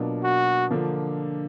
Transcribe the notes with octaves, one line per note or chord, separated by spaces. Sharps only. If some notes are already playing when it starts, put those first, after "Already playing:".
Already playing: B2 F#3 A#3 D4 F4
F#4
D3 F3 A#3 D4